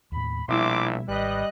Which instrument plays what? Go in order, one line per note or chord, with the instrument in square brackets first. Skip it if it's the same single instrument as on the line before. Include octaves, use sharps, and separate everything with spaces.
[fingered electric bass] D#2 A2 [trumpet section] B5
[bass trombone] A#1 [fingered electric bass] B2 G3 [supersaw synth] E4 E5 [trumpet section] C6 D6
[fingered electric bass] G#1 [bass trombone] G3 [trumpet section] B4 [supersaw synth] D#5 F#6